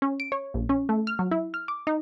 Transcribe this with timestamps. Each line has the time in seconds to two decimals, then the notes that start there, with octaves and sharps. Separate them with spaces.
0.02 C#4
0.20 D7
0.32 C#5
0.54 A#1
0.69 C#4
0.89 A3
1.07 F6
1.19 F#3
1.31 E4
1.54 F6
1.68 D6
1.87 D#4